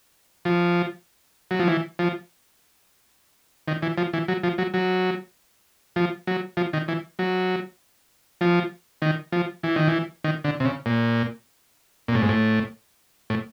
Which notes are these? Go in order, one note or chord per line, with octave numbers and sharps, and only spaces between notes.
F3
F#3
F3
E3
F3
D#3
E3
F3
E3
F#3
F3
F#3
F#3
F3
F#3
F3
D#3
E3
F#3
F3
D#3
F3
E3
D#3
E3
D#3
D3
C3
C#3
A#2
A#2
A2
G#2
A2
A2